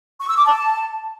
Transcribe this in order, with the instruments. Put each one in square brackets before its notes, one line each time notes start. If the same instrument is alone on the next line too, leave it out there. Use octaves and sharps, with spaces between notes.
[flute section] C#6
E6
D6
A5